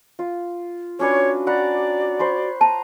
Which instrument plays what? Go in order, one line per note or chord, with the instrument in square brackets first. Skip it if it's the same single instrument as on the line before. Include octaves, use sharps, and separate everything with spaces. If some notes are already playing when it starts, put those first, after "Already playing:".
[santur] F4
[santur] C#4 D4 B4 [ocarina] F#4 [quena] C#5
[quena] D5 [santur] F#5 A#5 B5
[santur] C5 B5 C#6
[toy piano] A5 [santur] A#5